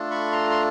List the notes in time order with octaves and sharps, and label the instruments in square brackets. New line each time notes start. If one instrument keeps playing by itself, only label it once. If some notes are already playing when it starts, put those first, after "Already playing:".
Already playing: [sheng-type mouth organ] A3 D4 F4 A4
B5 C#6
A#5 C6
C6